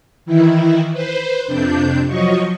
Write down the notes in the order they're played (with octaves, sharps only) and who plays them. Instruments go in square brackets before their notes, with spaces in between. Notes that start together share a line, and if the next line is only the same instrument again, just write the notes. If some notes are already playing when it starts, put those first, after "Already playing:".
[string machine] D#3 E3 E4
B4 C5
F2 C3 D4 G6
F3 F#3 D#5 C#6